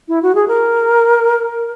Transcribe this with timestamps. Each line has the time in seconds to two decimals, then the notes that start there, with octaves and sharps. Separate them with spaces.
0.08 E4
0.23 F#4
0.35 G#4
0.48 A#4